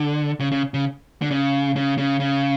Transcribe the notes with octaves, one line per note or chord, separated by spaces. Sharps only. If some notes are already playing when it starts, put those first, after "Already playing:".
Already playing: D3
C#3
C#3
C#3
D3
C#3
C#3
C#3
C#3